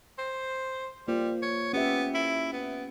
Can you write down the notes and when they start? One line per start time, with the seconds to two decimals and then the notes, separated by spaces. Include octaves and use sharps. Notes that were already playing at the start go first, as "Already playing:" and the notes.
0.18 C5
1.08 G3 A#3 F4 C5
1.43 C#5
1.73 B3 C#4 G4 E5
2.15 E4
2.53 B3